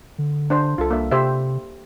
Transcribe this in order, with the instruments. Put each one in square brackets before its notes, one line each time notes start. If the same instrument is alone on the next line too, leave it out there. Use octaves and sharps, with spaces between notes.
[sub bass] D3
[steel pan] D4 C5
[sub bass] C2 [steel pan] F4 A4
[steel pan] A#3 D4 E5
[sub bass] C3 [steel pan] G4 C5 E5